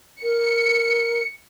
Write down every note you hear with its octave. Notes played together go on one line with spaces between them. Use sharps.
A#4 C#7